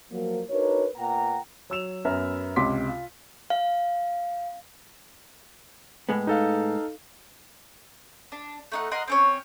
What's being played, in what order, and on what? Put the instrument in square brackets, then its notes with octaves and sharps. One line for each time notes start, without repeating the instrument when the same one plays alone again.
[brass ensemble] F3 F#3 A#3
D4 D#4 F#4 A#4 B4 C#5
A#2 B3 F#5 G5 A#5
[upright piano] F#3 E6 E7 F7
F#2 B3 E5 A#5 F6
C#2 C3 C6 D6 B6
F4
[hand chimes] F5
[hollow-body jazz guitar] A2 G#3 B3
[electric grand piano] D#4 A4 F5
[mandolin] D4
A3 D#4 F#5
A#4 D#5 F#5 C6
C4 C#4 C#5